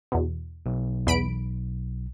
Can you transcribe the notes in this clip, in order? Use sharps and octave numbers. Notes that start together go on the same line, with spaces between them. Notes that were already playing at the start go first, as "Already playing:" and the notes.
E2 B2
B1
E2 B5 D7